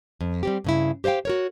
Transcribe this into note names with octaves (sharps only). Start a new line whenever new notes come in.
F2
G3 C4 G4
G2 C#3 E4
G4 C5 D#5 F5 G5
F#4 A#4 C#5